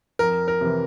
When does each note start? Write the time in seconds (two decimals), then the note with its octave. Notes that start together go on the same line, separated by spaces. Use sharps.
0.19 F2 A#4
0.48 A#4
0.61 C3 E3